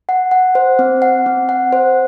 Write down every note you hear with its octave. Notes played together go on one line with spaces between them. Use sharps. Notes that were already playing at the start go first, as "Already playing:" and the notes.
F#5
F#5
C5
C4
F#5
C4
F#5
C5